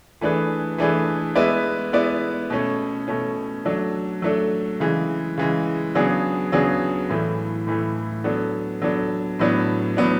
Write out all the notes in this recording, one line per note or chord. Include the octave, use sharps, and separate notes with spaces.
E3 A3 D4 G#4 B4
E3 A3 D4 G#4 B4
G#3 B3 E4 B4 D5
G#3 B3 E4 B4 D5
B2 A3 C#4
B2 A3 C#4
F#3 A3 D4 A4
F#3 A3 D4 A4
C#3 E3 G#3
C#3 E3 G#3
C#3 F#3 B3 D4 G#4
C#3 F#3 B3 D4 G#4
A2 E3 A3
A2 E3 A3
F#3 B3 D4 A4
F#3 B3 D4 A4
A2 F#3 B3 D4
A2 F#3 B3 D4